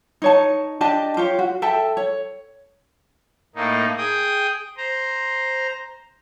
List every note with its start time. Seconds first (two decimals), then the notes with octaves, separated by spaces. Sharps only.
0.22 D#4 C#5 A5
0.81 D4 G4 D#5 A5
1.17 F4 G4 C#5
1.39 F#4
1.62 A4 E5 G5 A5
1.97 C#5
3.56 A2 A#3 D#4
3.97 G#4 G5 D#6
4.77 C5 A#5